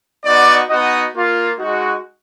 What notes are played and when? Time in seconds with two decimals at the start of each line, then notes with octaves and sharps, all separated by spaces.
0.24 B3 D#4 F#4 D5
0.69 B3 D#4 F#4 D#5
1.15 A#3 F4
1.59 G#3 D#4 F#4